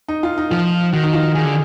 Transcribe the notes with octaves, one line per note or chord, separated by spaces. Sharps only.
D#4
F4
D#4
F3 F4
D#3 F#4
D#4
F4
D#3 G#4
D3